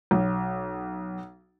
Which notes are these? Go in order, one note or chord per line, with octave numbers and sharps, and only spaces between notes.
B1